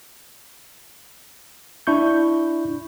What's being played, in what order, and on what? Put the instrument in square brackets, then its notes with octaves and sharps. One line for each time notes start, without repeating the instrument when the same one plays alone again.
[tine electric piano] D4 E4 C#6 G6